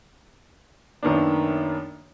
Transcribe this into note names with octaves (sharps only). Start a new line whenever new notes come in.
F#2 D#3 A#3 B3 D4